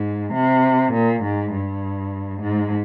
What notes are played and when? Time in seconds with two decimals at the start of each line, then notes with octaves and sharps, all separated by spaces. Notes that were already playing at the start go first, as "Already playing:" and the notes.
Already playing: G#2
0.34 C3
0.93 A#2
1.23 G#2
1.53 G2
2.42 G#2